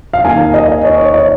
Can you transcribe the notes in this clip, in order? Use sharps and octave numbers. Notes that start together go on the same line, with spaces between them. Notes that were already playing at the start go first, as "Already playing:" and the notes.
F5
D#2 D#3 A#3 G#5
D#5
C#5
C#5
D#5